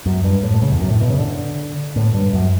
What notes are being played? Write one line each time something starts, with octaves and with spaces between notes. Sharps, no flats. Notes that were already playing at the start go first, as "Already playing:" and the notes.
F#2
G2
A2
A2
C#3
E2
F#2
A2
B2
C#3
D3
A2
G2
F#2